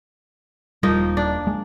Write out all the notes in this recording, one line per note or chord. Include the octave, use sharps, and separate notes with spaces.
D#1 F3 G3 A#3 D#4
D4
G#3